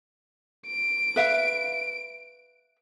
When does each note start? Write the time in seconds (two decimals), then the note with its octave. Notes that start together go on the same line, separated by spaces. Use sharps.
0.67 D7
1.16 B4 E5 F5